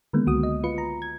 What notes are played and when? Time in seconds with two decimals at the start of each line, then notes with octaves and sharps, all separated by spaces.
0.13 D3 D#3 G#3 A#3 B3
0.27 C#2 F#4 D#6
0.43 D#5
0.64 F4 B4 C#7
0.78 A#5
1.02 G#6